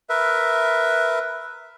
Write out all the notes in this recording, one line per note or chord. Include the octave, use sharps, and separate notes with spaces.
A#4 B4 E5